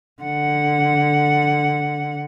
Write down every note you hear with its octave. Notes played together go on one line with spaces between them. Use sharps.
D3 F#5